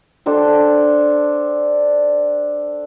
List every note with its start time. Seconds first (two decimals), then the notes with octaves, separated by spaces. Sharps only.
0.26 D4 A4 C5 G5